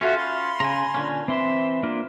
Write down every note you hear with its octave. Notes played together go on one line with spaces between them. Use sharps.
C#4 F4 F#4 A4 E5
B5 C6
C#3 G#5 A#5
A#2 D3 C#4
E3 C4 E5 C6
A#3 D4 F4